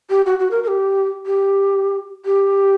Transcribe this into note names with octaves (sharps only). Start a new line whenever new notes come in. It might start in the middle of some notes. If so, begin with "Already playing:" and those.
G4
F#4
F#4
A#4
A#4
G4
G4
G4